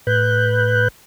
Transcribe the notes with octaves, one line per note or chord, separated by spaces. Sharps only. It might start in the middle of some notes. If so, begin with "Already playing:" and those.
A2 B4 F#6 G6